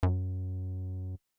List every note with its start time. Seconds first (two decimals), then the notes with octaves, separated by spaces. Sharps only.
0.03 F#2